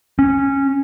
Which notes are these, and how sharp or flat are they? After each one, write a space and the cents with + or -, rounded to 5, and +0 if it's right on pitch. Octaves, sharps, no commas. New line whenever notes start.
C#4 -10